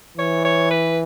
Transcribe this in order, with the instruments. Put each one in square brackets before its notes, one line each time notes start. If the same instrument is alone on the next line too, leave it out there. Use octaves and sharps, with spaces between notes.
[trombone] E3 [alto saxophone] C#5
[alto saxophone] C#5
B4